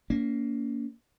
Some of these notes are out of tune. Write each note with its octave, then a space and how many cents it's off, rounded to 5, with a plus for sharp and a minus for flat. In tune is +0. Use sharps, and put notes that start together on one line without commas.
A#3 +0 C#4 +45